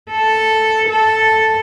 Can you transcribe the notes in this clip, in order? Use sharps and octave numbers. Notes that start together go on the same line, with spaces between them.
A4
A4